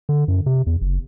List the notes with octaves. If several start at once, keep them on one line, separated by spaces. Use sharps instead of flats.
D3
F#2
C3
E2
F#1